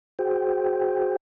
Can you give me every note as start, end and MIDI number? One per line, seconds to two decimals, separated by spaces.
0.19 1.16 66
0.19 1.16 68
0.19 1.16 72
0.19 1.16 79